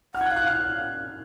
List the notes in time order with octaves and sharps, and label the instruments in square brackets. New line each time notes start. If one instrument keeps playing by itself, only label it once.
[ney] F#5 [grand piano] F6
[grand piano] G#6
F#6
[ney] F5
[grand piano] F#6
F6